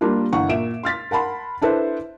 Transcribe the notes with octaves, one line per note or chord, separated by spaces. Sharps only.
G3 A#3 D4 F4
G1 E3 F#5 C#6
A#2 E5 D7 E7
C6 F6 A6 B6
A#4 F#5 A5 B5 C6
D4 E4 A4 B4 C5